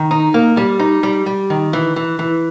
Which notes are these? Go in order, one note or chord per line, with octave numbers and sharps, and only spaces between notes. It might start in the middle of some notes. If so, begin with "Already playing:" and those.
Already playing: D#3
D#4
A#3
G3
D#4
G3
G3
D#3
E3
E3
E3